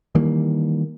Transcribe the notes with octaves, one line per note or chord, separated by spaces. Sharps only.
D#3 E3 G3 A#3